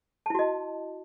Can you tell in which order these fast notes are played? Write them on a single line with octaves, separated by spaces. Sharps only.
A5 E4 F#4 D#5